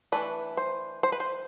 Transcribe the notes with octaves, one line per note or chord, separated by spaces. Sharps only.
E3 A3 D4 B4
C5
C5
B4
C5